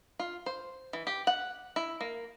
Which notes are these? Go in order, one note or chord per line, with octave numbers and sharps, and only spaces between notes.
F4
C5
E3
G4
F#5
E4
A#3